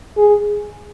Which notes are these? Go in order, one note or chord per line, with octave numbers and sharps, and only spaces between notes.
G#4